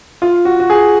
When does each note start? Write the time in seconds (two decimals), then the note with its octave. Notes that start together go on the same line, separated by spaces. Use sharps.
0.22 F4
0.45 F#4
0.60 F#4
0.70 G#4